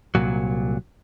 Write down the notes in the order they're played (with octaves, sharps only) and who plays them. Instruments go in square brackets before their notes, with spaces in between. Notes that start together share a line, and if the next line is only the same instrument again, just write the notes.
[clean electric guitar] C2 A#2 F#3